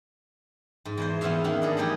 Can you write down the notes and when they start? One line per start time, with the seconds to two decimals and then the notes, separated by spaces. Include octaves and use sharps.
0.85 G#2
0.98 E2 E3 C5
1.21 E2 B3 C#4 C5 E5 F5
1.44 D#3 A#3 B3 A#4
1.62 D4 G#4 A4
1.77 E3 G3 A3 D#4 E4 G4